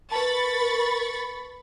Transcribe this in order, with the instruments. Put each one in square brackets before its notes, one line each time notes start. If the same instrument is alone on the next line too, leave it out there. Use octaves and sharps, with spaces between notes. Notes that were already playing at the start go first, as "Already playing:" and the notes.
[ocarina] A#4 [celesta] B4 A5 [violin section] B5 C#6 A6